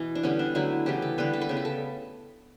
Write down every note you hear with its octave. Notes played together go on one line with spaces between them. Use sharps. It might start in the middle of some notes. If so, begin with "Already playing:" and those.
Already playing: B2 E3
D4
D3 G3 B3 C#4
D4
D3 F#3 A3 E4
C#3 E3 B3 G4
A4
D3 G3 B3 B4
A4
B4
C#3 G3 B3 A4
B4
A4